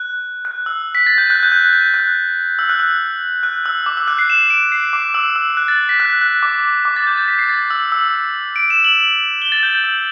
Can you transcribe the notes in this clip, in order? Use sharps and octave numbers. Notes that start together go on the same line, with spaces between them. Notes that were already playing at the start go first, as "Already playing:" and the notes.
Already playing: F#6
F#6
E6
B6
A6
G6
F#6
G6
F#6
G6
F#6
E6
F#6
E6
F#6
E6
D6
E6
F#6
C7
E7
D7
C7
D6
E6
E6
F#6
A6
B6
F#6
F#6
D6
D6
A6
G6
A6
B6
C7
A6
E6
E6
D7
E7
F#7
G7
A6
G6
E6